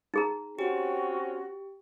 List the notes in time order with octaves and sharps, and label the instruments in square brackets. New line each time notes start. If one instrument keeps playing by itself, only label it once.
[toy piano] D#4 G#4 A#5
[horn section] C4 C#4 [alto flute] F#4 [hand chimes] G4